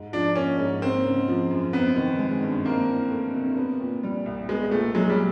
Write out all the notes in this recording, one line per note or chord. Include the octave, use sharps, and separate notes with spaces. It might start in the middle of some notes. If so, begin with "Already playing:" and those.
Already playing: G#2
F3 D4
A#3 C#4
G#2
A#3 C4
C#3
F3
F#2
B3 C4
D#3
G#3
G2
A#3 C4
E3
A3
C3
B3
A#2
G3
C2
G#3 B3
A#2 A3
F#3 G#3
G3